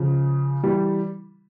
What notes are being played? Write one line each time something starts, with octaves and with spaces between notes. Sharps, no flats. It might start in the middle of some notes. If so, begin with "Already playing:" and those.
Already playing: C#3 F3
E3 G3